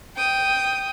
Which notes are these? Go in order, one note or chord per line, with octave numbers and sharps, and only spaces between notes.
G5 D#6